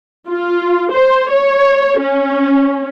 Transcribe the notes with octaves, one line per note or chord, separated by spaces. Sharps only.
F4
C5
C#5
C#4